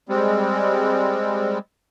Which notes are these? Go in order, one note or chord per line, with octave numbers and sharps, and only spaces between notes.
G3 G#3 C4